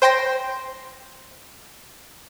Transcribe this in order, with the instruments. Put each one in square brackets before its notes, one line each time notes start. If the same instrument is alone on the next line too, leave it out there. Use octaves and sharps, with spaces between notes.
[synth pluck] C5 G5 C6 A#6